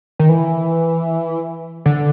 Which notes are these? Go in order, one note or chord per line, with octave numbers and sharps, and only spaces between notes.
D#3
E3
D3